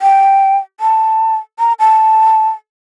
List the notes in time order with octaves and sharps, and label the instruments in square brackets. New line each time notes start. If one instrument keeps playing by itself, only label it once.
[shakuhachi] G5
A5
A#5
A5